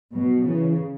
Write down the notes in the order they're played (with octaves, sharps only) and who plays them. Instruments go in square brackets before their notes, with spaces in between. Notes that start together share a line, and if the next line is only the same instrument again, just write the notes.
[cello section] B2 [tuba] F#3
[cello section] C#3 [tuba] E3